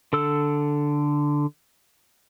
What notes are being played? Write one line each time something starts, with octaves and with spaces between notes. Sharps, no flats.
D3 A4 E6